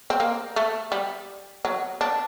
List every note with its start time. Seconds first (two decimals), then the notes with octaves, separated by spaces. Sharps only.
0.10 C4
0.20 A#3
0.56 A3
0.92 G3
1.65 F#3
2.01 D4